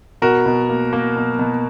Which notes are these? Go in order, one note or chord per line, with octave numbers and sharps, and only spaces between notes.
B2 F#4 A#4
B2
A#3
A#3
B2
B2